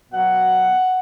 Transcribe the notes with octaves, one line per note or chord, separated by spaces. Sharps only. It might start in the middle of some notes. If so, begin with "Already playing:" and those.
B2 F#3 B3 F#5